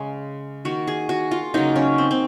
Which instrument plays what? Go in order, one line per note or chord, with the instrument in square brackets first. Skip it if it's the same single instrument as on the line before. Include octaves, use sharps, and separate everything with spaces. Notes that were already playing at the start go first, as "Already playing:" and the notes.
Already playing: [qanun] C#3 G#3
D#3 A#3 F#4
G#4
F#4
F4
C#3 F#3 A#3 D#4
C#4
C4
C4